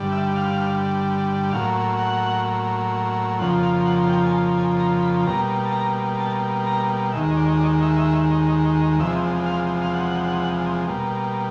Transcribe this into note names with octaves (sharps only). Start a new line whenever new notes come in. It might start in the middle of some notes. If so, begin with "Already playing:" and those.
Already playing: G2 D3 G3
E5
F5
A2 F#3 A#3 F5
F#5
F2 C#3 F3 A#3 F#5
F5
F#5
G5
G#5
A5
G#5
A#5
B5
B2 G3 A#3 A#5
A5
A#5
A5
A#5
D#2 D#3 G#3 E5
D5
D5
E5
E2 C3 F3 G#3 E5
F5
F5
F#5
B2 G3 A#3